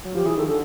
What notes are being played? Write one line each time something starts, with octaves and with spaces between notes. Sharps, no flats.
F#3
F3 G4
E3 G#4
D#3 A4
D3 A4